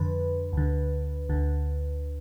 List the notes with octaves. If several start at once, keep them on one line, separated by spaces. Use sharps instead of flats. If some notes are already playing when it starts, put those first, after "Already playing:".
Already playing: F2 D3 B4
D2 D3
D2 D3